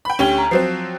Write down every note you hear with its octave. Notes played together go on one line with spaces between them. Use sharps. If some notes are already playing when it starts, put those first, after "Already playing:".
G5 B5
D2 C#4 G4 G5 G7
A#5
F3 F#3 C4 C7